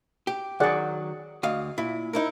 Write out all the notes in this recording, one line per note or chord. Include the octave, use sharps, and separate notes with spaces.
G4
D#3 F#3 G#4 D5 F#5
D2 D#5 F5
A#2 E4
D#4 E4 A#4